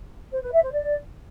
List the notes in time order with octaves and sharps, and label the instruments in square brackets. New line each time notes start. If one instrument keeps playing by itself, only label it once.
[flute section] C5
B4
E5
C5
D5